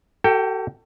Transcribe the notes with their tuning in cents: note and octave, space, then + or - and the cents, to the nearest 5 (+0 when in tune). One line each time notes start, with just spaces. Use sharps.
F#4 +45 A4 +25 G5 +0